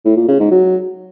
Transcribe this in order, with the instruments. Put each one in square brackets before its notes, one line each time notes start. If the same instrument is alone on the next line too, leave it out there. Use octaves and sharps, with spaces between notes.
[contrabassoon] A2
A#2
C#3
G#2
F#3